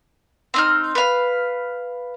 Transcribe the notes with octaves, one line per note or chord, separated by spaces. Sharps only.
C4 D#4 F6
B4 F5